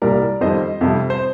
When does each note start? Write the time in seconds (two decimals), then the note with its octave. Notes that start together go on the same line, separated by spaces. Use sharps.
0.02 C2 A#2 G3 A#4 D5
0.41 F2 D#3 G3 C5 D#5
0.81 F2 C3 G3
1.10 C5